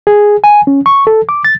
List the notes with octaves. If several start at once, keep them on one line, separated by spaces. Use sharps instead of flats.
G#4
G#5
C#4
C#6
A4
D6
A6